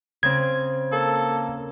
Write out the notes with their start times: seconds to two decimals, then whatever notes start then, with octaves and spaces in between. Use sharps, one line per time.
0.23 C#3 C4 G#6
0.92 A#3 A4